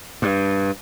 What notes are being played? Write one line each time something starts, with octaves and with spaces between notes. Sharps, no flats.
G2